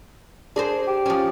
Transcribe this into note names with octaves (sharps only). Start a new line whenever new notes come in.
D4 G#4 A#4 C5
G4
F3 C#4